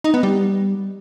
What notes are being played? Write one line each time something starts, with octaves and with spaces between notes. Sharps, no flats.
D#4
B3
G3